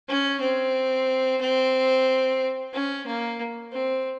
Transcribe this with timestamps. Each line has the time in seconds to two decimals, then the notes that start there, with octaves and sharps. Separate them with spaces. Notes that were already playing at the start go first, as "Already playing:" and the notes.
0.08 C#4
0.41 C4
1.41 C4
2.73 C#4
3.06 A#3
3.72 C4